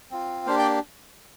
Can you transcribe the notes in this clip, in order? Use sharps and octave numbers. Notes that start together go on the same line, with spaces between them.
C4 F4
A#3 D4 G4 C5 F5
D5 G5